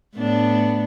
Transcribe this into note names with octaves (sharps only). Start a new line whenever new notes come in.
A2 B3 D4